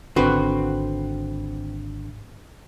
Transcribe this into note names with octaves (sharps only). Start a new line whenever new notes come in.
G#1 D3 C4 F#4 B4